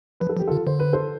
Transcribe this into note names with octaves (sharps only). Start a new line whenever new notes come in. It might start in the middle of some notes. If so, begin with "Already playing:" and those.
F3 B4
A4
F3
G4
D3 F4 A4
D3 C5
B4
A4 C5